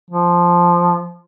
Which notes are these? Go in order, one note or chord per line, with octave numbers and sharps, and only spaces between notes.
F3